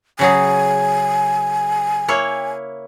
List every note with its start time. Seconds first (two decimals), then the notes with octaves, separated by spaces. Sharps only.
0.19 C#3 F#3 G#4 G#5
2.08 A#3 E4 C#5